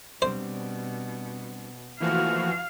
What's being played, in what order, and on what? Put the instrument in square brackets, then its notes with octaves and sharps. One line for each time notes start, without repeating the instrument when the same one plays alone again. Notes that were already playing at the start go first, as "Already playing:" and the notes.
[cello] B2 [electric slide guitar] G3 C4 D4 [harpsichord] C5
[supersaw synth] E3 F3 F#4 [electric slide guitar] A3 A#3 E4 [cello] F5